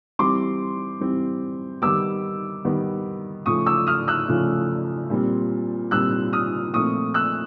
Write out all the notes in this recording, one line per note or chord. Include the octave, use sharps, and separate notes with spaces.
E3 G3 C4 C6 D6
E3 G3 C4
D#3 G3 B3 D6 E6
D#3 G3 B3
C#3 F3 A3 C#6 D#6
D6 E6
D#6 F6
E6 F#6
C#3 F3 A3
A#2 G3 C4
A#2 G3 C4 E6 F#6
D#6 F6
A#2 F3 A3 C4 C#6 D#6
E6 F#6